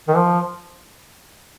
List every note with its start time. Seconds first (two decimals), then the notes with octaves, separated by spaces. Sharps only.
0.08 D#3
0.16 F3